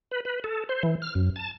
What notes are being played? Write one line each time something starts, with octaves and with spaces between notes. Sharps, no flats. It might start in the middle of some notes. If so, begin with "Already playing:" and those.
B4
B4
A4
C5
E3
F6
F#2
A5